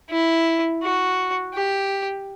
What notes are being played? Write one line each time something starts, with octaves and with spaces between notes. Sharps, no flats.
E4
F#4
G4